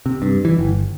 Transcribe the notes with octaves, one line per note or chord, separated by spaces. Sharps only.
C3
G2
E3
G1